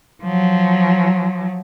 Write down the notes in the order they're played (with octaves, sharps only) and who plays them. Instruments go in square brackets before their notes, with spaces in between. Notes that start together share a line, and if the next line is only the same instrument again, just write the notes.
[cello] F3 F#3